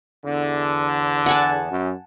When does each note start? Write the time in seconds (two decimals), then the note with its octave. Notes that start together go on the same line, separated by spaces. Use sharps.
0.25 E2 D3
1.26 F#5 G#5 A5
1.70 F#2